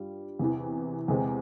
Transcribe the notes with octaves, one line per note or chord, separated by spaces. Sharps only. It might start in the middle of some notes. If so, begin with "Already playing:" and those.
Already playing: G2 G3 F4
E2 C3 E3
E2 C3 E3 G#3 C4